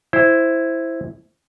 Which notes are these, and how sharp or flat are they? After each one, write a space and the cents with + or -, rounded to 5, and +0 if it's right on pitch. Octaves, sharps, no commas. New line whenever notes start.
E4 +0 C5 +0